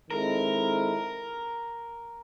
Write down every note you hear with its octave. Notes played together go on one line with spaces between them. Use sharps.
D#3 G#3 C4 E4 A4 A#4